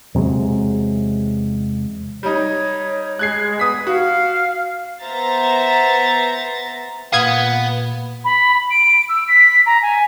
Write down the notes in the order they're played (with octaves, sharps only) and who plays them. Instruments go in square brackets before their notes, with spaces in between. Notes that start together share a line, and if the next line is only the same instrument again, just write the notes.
[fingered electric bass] E2 C3 F#3 G#3
[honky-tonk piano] G3 D#4 [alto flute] C#5
[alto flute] G#3 [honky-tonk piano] F#6 G#6 C7
[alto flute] B3 [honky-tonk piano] D#6 B6
[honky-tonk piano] F#4 [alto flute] F5
[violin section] B3 C5 E5 A#5 A6
[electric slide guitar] A#2 G4 [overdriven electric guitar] B3 [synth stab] F5 D#6 G#6
[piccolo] B5
D7
E6
B6
A#5
G#5